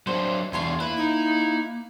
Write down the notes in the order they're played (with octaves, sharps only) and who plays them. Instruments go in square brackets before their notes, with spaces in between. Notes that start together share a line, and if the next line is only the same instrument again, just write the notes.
[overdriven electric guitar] F#3 D4 [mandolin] C5
[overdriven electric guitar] E2 D4 [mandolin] F4 C#5 C6
[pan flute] A#3 [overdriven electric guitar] E4 [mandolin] B4
[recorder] D#4